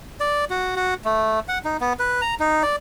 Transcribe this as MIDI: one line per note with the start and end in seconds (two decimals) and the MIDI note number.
0.20 0.45 74
0.50 0.76 66
0.76 0.94 66
1.05 1.40 57
1.48 1.59 78
1.65 1.77 63
1.81 1.93 59
1.99 2.21 71
2.21 2.35 82
2.40 2.63 63
2.63 2.76 74